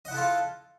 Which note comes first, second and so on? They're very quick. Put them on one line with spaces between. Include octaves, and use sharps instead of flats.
D#5 F#5 E4 A4 F4